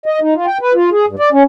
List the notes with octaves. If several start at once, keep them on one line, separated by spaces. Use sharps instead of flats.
D#5
D#4
F4
G5
B4
F4
G#4
G2
D5
C#4